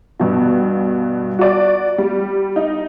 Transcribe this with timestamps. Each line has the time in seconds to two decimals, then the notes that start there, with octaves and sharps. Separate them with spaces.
0.20 G2 B2
1.39 F#4 D5
1.98 G3
2.56 D#4